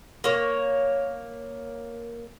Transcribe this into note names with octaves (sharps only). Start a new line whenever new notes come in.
A#3 C#5